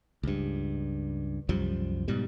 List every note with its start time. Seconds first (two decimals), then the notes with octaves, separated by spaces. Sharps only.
0.23 C#2 G2
1.49 C2 F#2 F3 G3
2.08 G#2 B2 G3